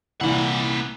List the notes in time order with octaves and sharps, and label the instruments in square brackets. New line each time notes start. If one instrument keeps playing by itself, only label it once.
[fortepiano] C2 A#2 E3 [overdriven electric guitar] A#3 F#5